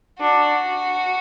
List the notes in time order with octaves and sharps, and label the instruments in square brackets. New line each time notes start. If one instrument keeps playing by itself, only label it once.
[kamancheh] D4 [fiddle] F#4